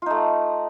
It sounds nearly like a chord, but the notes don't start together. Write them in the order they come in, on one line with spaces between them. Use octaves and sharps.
F4 D#4 A3